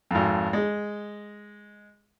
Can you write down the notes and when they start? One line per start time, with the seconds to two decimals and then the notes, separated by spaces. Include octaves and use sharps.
0.11 G#1 F2
0.53 G#3